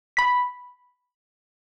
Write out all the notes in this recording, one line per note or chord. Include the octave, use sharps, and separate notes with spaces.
B5 B6